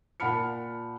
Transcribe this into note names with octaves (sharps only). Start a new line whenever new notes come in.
A#2 F#5 A5 B5 F6 C#7